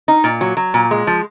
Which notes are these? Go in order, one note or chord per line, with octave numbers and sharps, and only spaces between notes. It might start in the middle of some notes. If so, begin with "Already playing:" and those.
D#4
A#2
F#3
F#3
A#2
G#3
F3